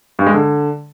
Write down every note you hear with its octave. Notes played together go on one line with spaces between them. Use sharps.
G2
G#3
D3